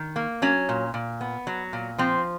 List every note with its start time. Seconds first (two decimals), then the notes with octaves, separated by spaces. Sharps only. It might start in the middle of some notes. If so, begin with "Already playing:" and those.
Already playing: D#3
0.16 A#3
0.42 F#3 C#4
0.69 A#2
0.94 A#2
1.21 B3
1.47 F#3
1.73 A#2
1.98 F3 C4